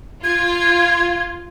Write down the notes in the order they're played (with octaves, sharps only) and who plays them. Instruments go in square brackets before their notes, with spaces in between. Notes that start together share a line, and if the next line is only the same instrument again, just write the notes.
[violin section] F4 [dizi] G#6